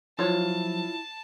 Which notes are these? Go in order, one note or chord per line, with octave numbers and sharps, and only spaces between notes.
F3 F#3 E4 F4 C#5 A5